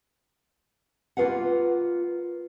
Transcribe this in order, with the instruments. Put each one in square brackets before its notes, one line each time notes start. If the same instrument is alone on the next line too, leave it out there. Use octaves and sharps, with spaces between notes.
[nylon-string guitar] A#3 F4 G#4 B4 F5 F#5